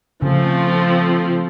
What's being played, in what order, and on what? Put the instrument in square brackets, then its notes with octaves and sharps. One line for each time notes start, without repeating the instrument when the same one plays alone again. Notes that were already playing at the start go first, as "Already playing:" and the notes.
[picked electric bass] C#3 [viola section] F3 A3 C4